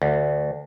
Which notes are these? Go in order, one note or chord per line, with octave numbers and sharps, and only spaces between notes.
D2